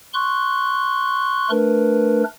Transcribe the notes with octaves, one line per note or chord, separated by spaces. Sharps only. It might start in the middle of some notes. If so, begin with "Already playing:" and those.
C6 C#6 F#6
A3 D4 A#4 B4